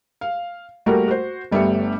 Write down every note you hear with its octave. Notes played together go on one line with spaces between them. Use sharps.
F5
G3 A3 A#3 F#4 A#4
F#4 C5
G1 G3 A3 B3 E5 C#7